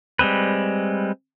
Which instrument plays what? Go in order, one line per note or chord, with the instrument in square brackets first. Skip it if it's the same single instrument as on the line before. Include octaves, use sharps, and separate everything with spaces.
[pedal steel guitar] G3 G#3 C4 B4